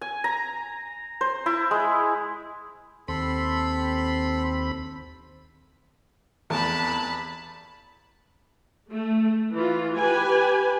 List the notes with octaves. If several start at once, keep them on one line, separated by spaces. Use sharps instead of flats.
G#5
A#5
C5
E4
G#3
D#2 C4 A4 B5 C6
F1 E2 A5 B5
A3
E3 F4
G4 B4 G#5